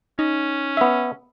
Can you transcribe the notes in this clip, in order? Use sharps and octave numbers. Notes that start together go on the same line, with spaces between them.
C#4 D#4
B3 E5